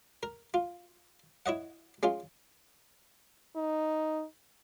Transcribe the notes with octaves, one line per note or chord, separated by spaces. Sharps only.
A#4
F4
E4 C#5 D#5 F#5
G#3 C#4 F4
D#4